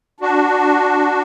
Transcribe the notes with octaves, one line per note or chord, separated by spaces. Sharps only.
D4 F#4